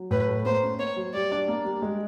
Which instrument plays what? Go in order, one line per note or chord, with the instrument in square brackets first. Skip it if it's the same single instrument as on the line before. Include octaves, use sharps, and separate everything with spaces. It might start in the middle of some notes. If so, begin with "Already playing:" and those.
Already playing: [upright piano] F#3
[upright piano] A2 [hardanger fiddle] B4
[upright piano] A3
[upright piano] A#3 [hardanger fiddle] C5
[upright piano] C#4
[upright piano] A#3 [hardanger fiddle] C#5
[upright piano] F#3
[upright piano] G3 [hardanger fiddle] D5
[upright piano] D4
A#3
G3
G#3